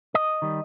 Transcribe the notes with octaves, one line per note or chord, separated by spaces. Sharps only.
D#5
D#3 G3